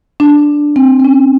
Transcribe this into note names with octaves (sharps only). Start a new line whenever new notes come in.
D4
C4
C4
C#4